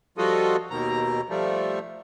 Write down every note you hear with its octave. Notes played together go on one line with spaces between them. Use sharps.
F3 G3 F4 F#4 A4 D#5
D#2 B2 D#3 A#5
F3 G3 A3